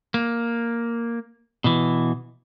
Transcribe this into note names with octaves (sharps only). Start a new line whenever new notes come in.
A#3
B2 E3